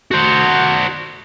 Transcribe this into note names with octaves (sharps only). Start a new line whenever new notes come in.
F#4 C5